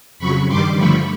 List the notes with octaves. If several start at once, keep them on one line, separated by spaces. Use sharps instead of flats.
F2 C#3 F#3 B5 C#6
G2 D#3 G3 C6 D6
G2 D3 F3 A3 B5 C#6